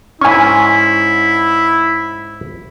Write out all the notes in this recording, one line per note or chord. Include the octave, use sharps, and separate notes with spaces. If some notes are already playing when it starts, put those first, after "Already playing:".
G#2 C#4 E4 G#5 C#6